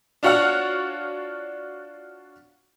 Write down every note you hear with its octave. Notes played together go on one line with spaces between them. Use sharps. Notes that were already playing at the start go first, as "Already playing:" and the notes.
D4 F4 F#4 C#5 F#5 F6